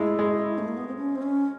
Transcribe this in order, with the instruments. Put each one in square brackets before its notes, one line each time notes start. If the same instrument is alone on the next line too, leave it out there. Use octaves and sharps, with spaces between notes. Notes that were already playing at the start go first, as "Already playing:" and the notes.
Already playing: [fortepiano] G#3 A3 [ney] E4
[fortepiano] G#3
[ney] A3
A#3
B3
C4
C#4
C4
C#4